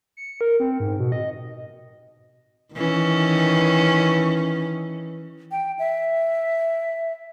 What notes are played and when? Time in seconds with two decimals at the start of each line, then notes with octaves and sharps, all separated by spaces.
0.17 C#7
0.41 A#4
0.60 C4
0.80 G#2
0.99 B2
1.12 D#5
2.74 D#3 E3 C#4
5.52 G5
5.79 E5